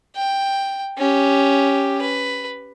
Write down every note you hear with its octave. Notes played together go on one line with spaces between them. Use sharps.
G5
C#4 G4
B4